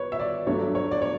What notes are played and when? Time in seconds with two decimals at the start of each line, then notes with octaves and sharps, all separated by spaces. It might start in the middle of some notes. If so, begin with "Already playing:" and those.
Already playing: B4 C#5
0.12 E5
0.20 D5
0.47 G2 F#3 A3 D4 C#5
0.75 C#5
0.91 D5
1.02 C#5